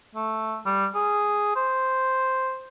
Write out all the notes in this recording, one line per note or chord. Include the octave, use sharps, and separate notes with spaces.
A3
G3
G#4
C5